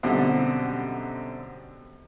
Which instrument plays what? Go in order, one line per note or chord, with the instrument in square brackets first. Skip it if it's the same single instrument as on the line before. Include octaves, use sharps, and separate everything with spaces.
[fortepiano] F#2 B2 D3 G3 C4